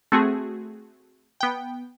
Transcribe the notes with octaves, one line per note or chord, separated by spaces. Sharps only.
A3 C4 F#4 G#4
B3 G5